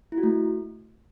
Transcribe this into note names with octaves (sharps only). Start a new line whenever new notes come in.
E4
F#4
A3